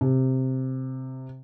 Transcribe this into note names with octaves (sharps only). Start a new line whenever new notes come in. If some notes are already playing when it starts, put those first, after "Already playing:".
C3